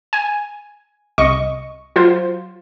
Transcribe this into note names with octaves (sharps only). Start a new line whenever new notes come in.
G#5
C2 D#5 C#6
F#3 F4 C5